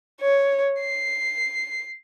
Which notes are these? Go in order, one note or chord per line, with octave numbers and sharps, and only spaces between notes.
C#5
C7